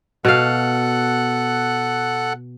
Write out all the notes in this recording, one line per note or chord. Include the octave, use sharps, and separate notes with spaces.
B2 A4 F5 F#5 F#6